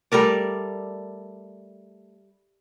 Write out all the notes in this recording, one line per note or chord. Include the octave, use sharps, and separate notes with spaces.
G3 A3 A#4 D5